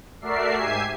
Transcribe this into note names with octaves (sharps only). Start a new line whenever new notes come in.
A3 F#4 A#4 D5 E5 C7
G#2 G4 E5 G#5 G#6 C7